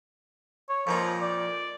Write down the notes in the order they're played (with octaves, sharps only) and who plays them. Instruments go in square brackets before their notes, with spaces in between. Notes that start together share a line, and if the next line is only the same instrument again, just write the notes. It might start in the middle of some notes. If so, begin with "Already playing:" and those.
[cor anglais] C#5
[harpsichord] F2 A#2 D#4 [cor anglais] F3
[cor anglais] D5